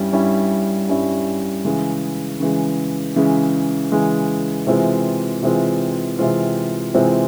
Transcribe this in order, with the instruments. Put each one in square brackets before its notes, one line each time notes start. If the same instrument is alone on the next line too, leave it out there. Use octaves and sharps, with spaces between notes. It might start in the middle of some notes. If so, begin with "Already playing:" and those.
Already playing: [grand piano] G2 G3 C#4 E4
G2 G3 C#4 E4
G2 G3 C#4 E4
C#3 E3 G#3
C#3 E3 G#3
C#3 E3 G#3
C#3 E3 G#3
C3 E3 G#3 C4 F4
C3 E3 G#3 C4 F4
C3 E3 G#3 C4 F4
C3 E3 G#3 C4 F4